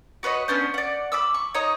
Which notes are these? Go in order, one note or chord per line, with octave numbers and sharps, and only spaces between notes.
F#4 B4 C#5 D#5
B3 C#4 D4 C5
D5 F#5
B5 D6 E6
C#6
D#4 C#5 D#5 A#5